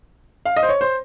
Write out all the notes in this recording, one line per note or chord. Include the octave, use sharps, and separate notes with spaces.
F5
D#5
C5
C#5
C5